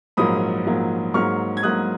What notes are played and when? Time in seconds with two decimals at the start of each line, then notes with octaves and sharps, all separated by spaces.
0.17 A#1 G#2 F#3 A#3 B5 D#6
0.65 A#1 G#2 F#3 A#3
1.14 G#2 F#3 A#3 C#6 F6
1.57 G#6
1.63 G#2 F#3 A#3 D#6 F#6